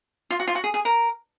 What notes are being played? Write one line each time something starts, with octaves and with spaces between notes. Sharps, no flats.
F4
F#4
F4
F#4
G#4
G#4
A#4